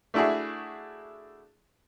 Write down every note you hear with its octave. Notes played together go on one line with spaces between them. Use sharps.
A3 D4 E4 F#4 G#4